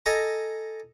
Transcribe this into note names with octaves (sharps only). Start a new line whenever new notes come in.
A4 D#5 G#5 A#5